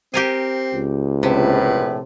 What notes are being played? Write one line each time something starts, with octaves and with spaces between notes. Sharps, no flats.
C4 G4 A#4 G#5
C#2
A#1 A2 C3 B4